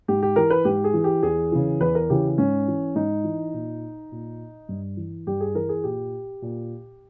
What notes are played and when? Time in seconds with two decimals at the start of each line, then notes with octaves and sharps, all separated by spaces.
0.08 G#2 G4
0.23 G4
0.36 E3 A#4
0.50 B4
0.65 G#2 G4
0.84 G#4
0.94 E3
1.04 G4
1.23 E2 G#4
1.52 C#3 E3
1.80 E2 B4
1.95 A#4
2.10 C#3 E3 G4
2.38 G#2 C#4
2.68 E3
2.95 G#2 D#4
3.24 E3
3.54 A#2
4.12 A#2
4.69 G2
4.97 E3
5.27 G2 G4
5.40 G#4
5.55 E3 A#4
5.69 G#4
5.84 A#2 G4
6.42 A#2